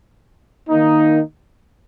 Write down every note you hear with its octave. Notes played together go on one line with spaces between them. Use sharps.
D#3 A#3 D#4